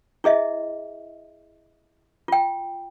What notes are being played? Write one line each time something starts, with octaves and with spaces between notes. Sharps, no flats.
E4 G#4 D#5 E5
F4 G5